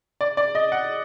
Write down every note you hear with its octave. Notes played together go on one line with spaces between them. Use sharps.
D5
D5
D#5
F#5